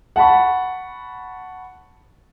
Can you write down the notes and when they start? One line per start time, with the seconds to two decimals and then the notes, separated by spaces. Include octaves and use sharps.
0.16 F#5 A5 B5 C#6